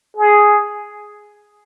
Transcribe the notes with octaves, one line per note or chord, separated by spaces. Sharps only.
G#4